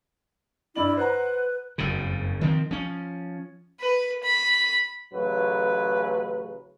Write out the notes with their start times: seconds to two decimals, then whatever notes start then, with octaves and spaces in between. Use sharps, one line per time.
0.75 G2 E4 D5 F#7
0.97 B4 C5 F#5 A#5
1.78 F#1 F2 G#2 C#3
2.41 D#3 F3 C4
2.71 F3 C#4
3.80 B4
4.23 B5
5.13 A1 C#3 F#3 A3 B4